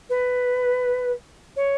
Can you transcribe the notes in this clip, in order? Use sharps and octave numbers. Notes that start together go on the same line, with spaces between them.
B4
C#5